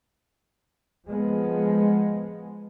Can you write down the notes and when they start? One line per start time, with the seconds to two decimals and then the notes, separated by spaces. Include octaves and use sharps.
1.09 F3 G#3 B3